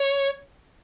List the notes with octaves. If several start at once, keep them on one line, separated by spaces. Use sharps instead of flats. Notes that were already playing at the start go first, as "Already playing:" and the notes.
Already playing: C#5